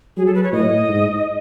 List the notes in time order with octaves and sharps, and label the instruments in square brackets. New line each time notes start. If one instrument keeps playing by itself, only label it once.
[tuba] F#3 [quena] G#4
[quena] A4
B4
C#5
[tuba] A2 [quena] D#5
[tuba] G#2